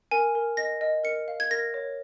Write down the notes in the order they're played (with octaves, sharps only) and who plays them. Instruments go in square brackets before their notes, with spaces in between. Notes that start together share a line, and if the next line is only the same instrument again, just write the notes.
[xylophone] A#4 G#5
A#4
D#5 A#6
D#5
A#4 C#7
F5
G#6
A#4 A#6
C#5